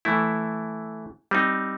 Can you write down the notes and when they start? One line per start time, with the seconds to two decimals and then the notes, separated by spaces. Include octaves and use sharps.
0.05 E3 A3 E4
1.31 G3 C4 D#4